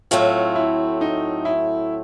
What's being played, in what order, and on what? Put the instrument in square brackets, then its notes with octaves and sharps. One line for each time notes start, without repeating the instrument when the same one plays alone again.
[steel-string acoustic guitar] A2 F#3 A3 C4 [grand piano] F4
[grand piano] E4
D#4
E4